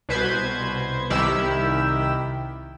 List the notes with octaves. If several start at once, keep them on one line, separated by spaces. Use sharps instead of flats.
C2 B2 B4 C5 G#6
C2 D#3 E4 G4 B5 E6